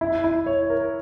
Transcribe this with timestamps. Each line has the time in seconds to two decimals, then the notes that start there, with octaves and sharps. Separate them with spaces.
0.01 E4
0.24 E4
0.46 C#5
0.70 A#4